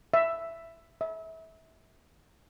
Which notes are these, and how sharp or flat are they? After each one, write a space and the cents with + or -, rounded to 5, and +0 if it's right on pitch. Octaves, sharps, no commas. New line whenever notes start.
E5 +10
E5 -30